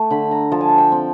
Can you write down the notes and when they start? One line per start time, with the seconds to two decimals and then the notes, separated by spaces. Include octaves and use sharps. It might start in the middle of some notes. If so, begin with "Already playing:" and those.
Already playing: A3
0.10 D3 B5
0.31 A#5
0.52 F3 A5
0.61 G#5
0.69 A5
0.78 G5
0.92 C4